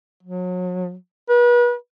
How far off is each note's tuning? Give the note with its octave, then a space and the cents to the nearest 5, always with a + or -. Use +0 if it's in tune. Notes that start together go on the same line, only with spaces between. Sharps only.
F#3 -35
B4 -35